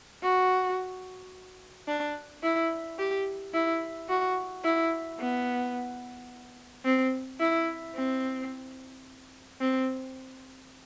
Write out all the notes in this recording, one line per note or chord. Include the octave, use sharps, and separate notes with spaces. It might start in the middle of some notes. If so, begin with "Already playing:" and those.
F#4
D4
E4
G4
E4
F#4
E4
B3
C4
E4
C4
C4